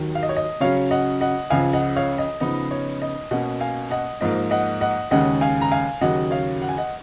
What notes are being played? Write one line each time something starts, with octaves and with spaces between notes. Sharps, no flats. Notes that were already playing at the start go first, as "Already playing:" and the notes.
Already playing: D#2 D#3 F#3
F5
D#5
C#5
D#5
C#3 F#3 C#4 C#5 F5
D#5 F#5
D#5 F#5
C#2 C#3 F3 F5 G#5
D#5 F#5
C#5 F5
D#5
C#3 F3 B3 D#4 D#5
C#5
D#5
B2 A#3 C#4 D#5 F#5
F5 G#5
D#5 F#5
G#2 F3 A#3 D#5
D#5 F#5
D#5 F#5
D#2 C#3 G#3 C#4 D#5 F#5
F5 G#5
A#5
F5 G#5
D#2 C#3 F#3 D#5 F#5
C#5 F5
F#5
G#5
D#5 F#5